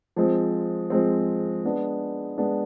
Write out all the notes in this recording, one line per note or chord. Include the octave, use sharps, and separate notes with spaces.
F3 G#3 C4
F3 G#3 C4
G#3 B3 D4
G#3 B3 D4